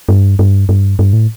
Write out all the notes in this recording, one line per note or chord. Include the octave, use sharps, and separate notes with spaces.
G2
G2
G2
G2
A2